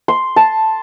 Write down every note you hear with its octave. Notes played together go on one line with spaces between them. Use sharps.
C6
A5